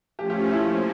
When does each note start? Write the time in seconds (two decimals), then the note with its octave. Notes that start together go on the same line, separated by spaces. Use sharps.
0.19 F3 A3 C#4 G4
0.30 G4
0.40 F4
0.51 E4
0.62 F3 A#3 E4